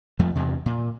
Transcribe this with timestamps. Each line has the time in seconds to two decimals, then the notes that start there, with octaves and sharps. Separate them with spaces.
0.19 F2 F3 A3
0.35 E2 G2 C3
0.66 A#2